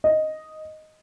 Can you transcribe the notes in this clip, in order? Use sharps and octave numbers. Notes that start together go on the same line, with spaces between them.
D#5